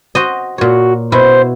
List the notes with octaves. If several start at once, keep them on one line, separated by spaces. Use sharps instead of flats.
F#4 C5 D#5
A#2 F#4 C#5
B2 E4 C5